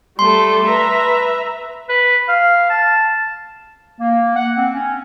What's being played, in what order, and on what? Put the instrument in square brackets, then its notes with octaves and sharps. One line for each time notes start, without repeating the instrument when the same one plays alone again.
[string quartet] G3 A3 A4 [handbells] C6
[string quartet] B4 E5 A#5
[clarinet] B4
F5
A5
[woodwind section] A#3
F#5
C4
C#4